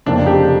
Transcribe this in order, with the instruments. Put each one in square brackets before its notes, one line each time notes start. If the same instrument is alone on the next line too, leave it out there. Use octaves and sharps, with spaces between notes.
[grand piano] F1 F2 C#3 F3 A#3 [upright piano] D4
[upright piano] G4